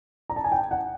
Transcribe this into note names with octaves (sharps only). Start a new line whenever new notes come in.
A#5
A5
G#5
G5
F#5